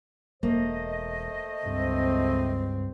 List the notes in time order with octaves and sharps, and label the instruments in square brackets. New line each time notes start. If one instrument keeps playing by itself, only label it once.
[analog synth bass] E1 [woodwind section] A3 C5 D#5 [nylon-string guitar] A#3
[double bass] C#2 C4 [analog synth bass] G2